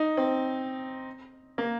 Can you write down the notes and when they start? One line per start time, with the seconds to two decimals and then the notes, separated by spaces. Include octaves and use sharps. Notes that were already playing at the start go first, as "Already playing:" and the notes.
Already playing: D#4
0.17 C4
1.58 A#3